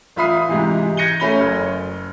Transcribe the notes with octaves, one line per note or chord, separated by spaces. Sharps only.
A1 F4 E5 B5 D#6 C7
G#2 C3 E3
G6 G#6 A#6 C#7 D#7 G7
A3 C#4 B5 G7
F#1